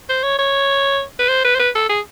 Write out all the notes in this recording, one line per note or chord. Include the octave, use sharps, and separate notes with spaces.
C5
C#5
C#5
B4
C5
B4
C5
B4
A4
G#4